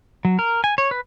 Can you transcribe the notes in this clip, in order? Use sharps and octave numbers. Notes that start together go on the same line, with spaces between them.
F#3
A#4
G#5
C#5
B4